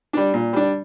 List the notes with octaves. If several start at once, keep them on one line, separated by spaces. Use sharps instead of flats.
G3 D4
A#2
G3 D4